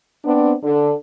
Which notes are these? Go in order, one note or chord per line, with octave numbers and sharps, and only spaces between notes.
B3 C4 D4
D3